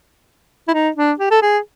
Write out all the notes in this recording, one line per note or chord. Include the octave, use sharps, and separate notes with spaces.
E4
D#4
D4
G4
A4
G#4